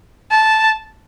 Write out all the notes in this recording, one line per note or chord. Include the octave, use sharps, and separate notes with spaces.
A5